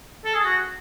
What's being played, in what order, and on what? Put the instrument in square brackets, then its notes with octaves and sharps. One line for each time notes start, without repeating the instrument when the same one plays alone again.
[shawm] A4
G#4
F#4